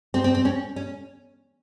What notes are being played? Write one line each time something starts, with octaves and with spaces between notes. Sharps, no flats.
C4
C4
C4
C#4
C#4